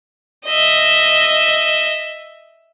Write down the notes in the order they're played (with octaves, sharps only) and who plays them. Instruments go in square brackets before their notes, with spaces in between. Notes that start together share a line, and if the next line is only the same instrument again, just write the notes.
[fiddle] D#5 E5